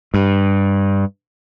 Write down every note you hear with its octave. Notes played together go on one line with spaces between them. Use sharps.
G2